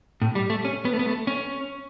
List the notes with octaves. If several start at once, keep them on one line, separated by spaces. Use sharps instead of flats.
A2
G3
A3
C#4
B3
A3
B3
A3
C#4